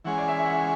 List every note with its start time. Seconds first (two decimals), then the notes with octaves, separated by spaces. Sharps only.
0.05 E3 G#3 C#4 G#4 F#5
0.18 D5
0.28 E5
0.38 E5
0.45 F#5
0.53 E5